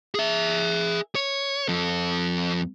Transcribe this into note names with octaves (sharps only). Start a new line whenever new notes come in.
G#4 E5
C#5
F2 A4